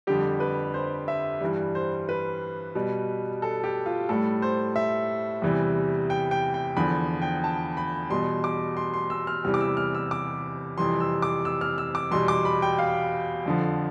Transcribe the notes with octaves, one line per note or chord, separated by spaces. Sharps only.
F2 D3 G3 G4
B4
C5
E5
G2 E3 G3
C5
B4
B2 G3
A4
G4
F4
A2 G3 A4
C5
E5
E2 C3 E3 G3
G5
G5
G5
E2 D3 F3 B5
G5
A5
B5
E2 B2 G3 C6
D6
C6
C6
E6
F6
E2 C3 E3 G3 F6
D6
E6
F6
E6
D6
F2 C3 E3 G3 C6
E6
D6
E6
F6
E6
D6
E2 B2 G3 C6
D6
B5
G5
F5
F2 D3 F3